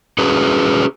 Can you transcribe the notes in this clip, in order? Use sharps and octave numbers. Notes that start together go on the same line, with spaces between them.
C#4 F#4 G#4 B4